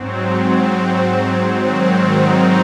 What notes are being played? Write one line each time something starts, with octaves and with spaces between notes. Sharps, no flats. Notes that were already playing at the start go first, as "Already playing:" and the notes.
Already playing: G#2 F#3 C4
C4
G#2 D#3 F#3 C4
D#4